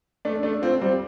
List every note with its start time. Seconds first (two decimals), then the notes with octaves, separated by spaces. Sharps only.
0.25 A3 D4
0.43 A3 D4
0.62 C4 F4
0.81 G3 C4